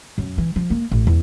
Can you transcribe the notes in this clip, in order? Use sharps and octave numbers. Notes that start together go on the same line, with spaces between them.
F#2
E3
F3
A#3
A1
E2